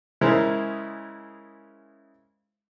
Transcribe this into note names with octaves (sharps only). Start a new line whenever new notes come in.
C#3 G#3 E4 A#4 C5